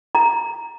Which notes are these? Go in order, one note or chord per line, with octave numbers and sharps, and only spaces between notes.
A#5